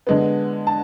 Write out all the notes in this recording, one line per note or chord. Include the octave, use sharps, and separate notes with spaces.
D3 G#3 B3
A5